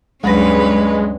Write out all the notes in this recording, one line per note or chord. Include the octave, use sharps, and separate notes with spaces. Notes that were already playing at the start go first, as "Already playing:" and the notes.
D2 G2 F#3 G#3 C#4 B4 A#6